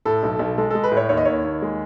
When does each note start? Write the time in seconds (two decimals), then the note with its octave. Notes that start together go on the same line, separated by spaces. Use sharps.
0.05 A2 A4
0.23 B1
0.39 B1
0.58 G#3 A4
0.70 G#3 A4
0.84 B4
0.92 A2
0.97 C#5
1.09 D#2 C#5
1.17 D#5
1.25 D#2 C#5
1.44 D#2
1.62 G#3